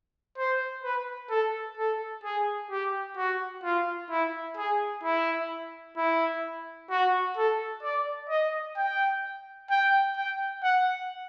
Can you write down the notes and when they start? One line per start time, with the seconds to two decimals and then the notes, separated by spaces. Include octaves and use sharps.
0.38 C5
0.84 B4
1.30 A4
1.78 A4
2.24 G#4
2.71 G4
3.17 F#4
3.64 F4
4.10 E4
4.57 G#4
5.03 E4
5.97 E4
6.90 F#4
7.37 A4
7.83 D5
8.29 D#5
8.77 G5
9.70 G5
10.17 G5
10.63 F#5